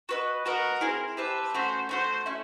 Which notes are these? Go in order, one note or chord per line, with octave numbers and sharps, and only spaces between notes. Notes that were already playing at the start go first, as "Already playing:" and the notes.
F#4 B4 D#5
F#4 A#4 B4 D#5 F#5
C4 E4 G#4
G4 B4 C5 E5 A5
A3 C#4 F#4 C5
A3 C#4 F#4 C5
A3 C#4 E4